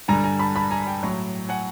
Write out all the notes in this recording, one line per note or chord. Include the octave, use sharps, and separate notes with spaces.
G2 D3 G3 G#5 A#5
G#5 A#5
A5 B5
A5 B5
G#5 A#5
G5 A5
A2 F#3
F#5 G#5